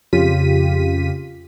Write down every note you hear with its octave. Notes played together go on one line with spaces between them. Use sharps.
F2 C#3 F4 G4 B6 D#7